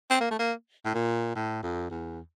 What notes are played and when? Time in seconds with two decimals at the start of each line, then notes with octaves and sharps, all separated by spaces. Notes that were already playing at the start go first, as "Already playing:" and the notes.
0.10 C4
0.20 A#3
0.31 A3
0.39 A#3
0.85 A2
0.94 A#2
1.36 A2
1.63 F2
1.90 E2